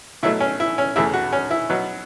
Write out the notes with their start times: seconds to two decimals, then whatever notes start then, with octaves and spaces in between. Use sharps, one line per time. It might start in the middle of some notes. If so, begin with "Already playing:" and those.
0.23 B2 F#3 A3 E4
0.40 C#4
0.60 E4
0.78 C#4
0.96 E2 C#3 E3 A3 E4
1.14 F#4
1.33 C#4
1.51 E4
1.70 B2 F#3 B3